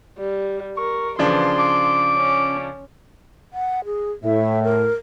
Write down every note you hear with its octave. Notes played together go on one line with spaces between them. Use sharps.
G3
A#4 C#6
C#3 E3 F3 D4 C6
D6
C#4
F#5
G#4
A2 E5
A#4